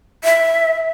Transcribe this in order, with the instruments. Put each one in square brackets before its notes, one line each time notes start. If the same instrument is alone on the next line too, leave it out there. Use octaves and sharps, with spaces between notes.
[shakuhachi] E5